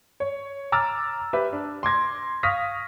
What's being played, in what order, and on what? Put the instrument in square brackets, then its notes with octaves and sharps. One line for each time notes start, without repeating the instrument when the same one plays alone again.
[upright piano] C#5
A#5 D6 E6 F6 A6
G4 B4 E5
D4
C6 D6 G#6 A#6
F5 C#6 D#6 F6 A#6 B6